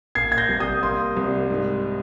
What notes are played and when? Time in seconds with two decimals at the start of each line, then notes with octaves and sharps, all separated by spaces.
0.15 A#3 G#6 C7
0.32 G#6
0.38 G6 A#6
0.49 C2
0.60 D#6 G6
0.83 A#3 C6 D#6
1.16 C2
1.50 G#2